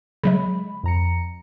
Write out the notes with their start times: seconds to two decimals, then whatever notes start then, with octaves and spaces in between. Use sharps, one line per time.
0.23 C#3 F#3 G#3 B5
0.83 F2 A#5 C#7